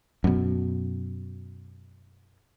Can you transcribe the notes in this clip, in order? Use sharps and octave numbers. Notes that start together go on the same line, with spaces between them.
F#2 B2